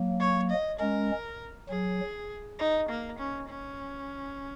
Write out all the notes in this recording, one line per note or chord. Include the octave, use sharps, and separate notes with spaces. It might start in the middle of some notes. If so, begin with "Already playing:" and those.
Already playing: F#3 A#3
C#5
D#5
G#3 C#4 A#4
F#3 G#4
D#4
A#3
C#4
C#4